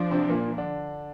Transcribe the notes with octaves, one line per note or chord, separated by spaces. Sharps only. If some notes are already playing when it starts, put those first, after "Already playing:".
Already playing: F3 D4
C3 C4
A#2 A#3
D3 D4